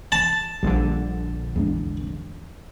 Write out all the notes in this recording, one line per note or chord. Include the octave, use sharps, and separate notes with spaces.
A5
A#1 D3 G3
E2 G#3 D4